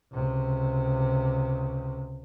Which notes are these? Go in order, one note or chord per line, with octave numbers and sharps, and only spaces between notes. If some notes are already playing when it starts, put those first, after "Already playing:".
C#2 C3